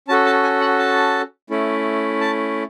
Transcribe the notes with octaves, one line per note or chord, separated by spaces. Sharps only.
C#4 F#4 A4 A5
A5
G#5
F#5
A5
A3 C#4 E4
A5